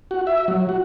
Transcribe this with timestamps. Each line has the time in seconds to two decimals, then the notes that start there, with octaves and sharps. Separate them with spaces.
0.11 F#4
0.27 E5
0.48 F#3
0.69 F#4